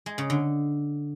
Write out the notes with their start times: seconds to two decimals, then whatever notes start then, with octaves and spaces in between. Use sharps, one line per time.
0.06 G#3
0.18 C#3
0.30 D3